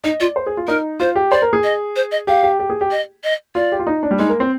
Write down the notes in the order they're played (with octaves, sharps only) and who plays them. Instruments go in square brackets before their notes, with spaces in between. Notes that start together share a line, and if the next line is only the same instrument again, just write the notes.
[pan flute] D#4 [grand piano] D#5
[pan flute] F4 [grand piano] D5
[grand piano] C5
G#4
F4
[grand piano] D#4 [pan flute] A#4
[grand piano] F4 [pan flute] C5
[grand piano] G4
[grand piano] C5 [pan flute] D5
[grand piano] A#4
G#4
[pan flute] D#5
C5
D#5
[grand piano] G4 [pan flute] F5
[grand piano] G4
G4
G#4
G4
[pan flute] D#5
D#5
[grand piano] F4 [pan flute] D5
[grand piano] G4
F4
D#4
D4
G3
[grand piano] G#3 [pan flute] D#4
[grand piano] A#3
C4